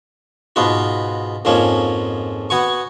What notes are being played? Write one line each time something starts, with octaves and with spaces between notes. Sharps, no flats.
G#2 B2 B3 F4 F#4
F2 G#2 F3 A#3 C#4
B3 F#4 G#5 C#6